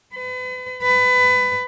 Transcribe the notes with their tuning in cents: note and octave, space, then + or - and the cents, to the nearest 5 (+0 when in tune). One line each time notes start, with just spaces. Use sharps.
B4 +40
B4 +25